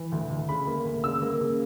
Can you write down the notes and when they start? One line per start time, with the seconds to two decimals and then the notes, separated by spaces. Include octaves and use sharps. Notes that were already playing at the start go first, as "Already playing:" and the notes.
Already playing: E3
0.12 D2
0.30 D2
0.48 C#3 B5
0.67 A#3
0.85 D2
1.04 C#3 E6
1.22 A#3
1.41 C#3